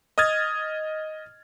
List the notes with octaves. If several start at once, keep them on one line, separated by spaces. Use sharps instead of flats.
D#5 D#6 F6 G#6 A6